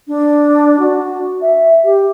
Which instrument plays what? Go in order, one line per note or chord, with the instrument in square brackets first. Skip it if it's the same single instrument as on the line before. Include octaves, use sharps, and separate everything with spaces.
[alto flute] D4
F#4
E5
G4